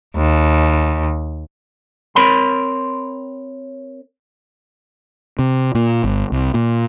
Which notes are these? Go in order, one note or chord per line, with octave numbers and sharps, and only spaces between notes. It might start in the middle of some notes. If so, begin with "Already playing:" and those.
D#2
C4 A#4 C#5 B5 C6
C3
A#2
G1
C2
A#2